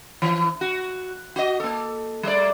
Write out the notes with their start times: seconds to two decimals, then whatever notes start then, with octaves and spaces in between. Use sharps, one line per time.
0.22 E3
0.61 F#4
1.36 F#4 D#5
1.60 A#3 A4
2.23 G3 D5